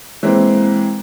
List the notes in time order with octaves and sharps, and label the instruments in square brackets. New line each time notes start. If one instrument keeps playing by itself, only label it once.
[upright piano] E3 G#3 A#3 C4